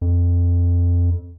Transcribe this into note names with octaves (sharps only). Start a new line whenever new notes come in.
F2